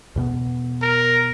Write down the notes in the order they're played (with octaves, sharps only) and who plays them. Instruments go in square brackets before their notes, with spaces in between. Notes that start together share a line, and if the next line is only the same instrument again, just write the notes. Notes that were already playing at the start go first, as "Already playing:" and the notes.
[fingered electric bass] E2 B2 B3
[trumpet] A#4